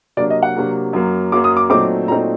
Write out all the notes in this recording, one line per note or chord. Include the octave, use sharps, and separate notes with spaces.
C3 F#3 A#3 D4 D5
D#5
F#5
C3 F#3 A#3 D4
F#2 F#3 A#3
F#2 F#3 A#3 D6
D#6
D6
A#2 F#3 A3 C4 D#4 D6
A#2 F#3 A3 C4 D#4 A#5